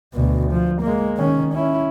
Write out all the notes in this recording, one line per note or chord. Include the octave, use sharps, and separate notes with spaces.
D2 B2
F3
G#3 A#3
D#3 C#4
C#4 E4